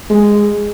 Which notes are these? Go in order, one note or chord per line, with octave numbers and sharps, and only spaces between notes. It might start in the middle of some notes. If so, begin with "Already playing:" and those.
G#3